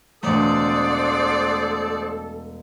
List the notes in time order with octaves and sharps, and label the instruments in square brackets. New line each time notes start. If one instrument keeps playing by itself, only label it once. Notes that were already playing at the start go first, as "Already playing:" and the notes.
[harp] E1 A3 [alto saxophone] A4 [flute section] C5 F#5 D#6 [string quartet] D5